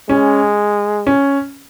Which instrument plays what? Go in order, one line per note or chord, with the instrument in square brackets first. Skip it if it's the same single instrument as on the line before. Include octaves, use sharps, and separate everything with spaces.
[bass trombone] G#3 [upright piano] C#4
[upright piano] C#4